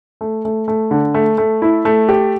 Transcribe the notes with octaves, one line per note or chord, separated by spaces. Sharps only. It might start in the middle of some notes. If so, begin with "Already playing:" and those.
A3
A3
A3
D3
A3
A3
E4
A3
G4